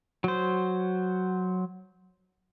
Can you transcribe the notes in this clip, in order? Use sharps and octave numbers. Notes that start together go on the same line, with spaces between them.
F#3 C5